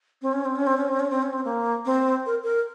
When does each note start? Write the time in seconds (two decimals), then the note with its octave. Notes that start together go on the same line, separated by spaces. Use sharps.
0.22 C4
0.33 C#4
0.45 C4
0.56 C#4
0.67 C4
0.78 C#4
0.88 C4
1.00 C#4
1.10 C4
1.23 C#4
1.33 C4
1.45 A#3
1.85 C4
2.26 A#4
2.44 A#4